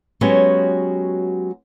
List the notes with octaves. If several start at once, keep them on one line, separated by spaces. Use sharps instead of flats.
F#3 G#3 B3 C#4 F#4 G4